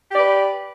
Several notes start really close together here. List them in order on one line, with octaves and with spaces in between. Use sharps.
G4 D5 B4